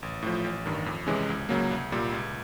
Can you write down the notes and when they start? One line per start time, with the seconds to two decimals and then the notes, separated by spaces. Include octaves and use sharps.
0.02 A1
0.23 A2 F3
0.45 A1
0.66 G2 D#3
0.86 F2
1.07 C3 E3 G#3 C#4
1.29 C#2
1.49 C#3 F#3 A#3
1.71 C2
1.92 A#2 G3
2.12 C#2